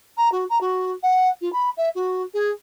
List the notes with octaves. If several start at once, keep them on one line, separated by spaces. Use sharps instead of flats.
A#5
F#4
A#5
F#4
F#5
F4
B5
E5
F#4
G#4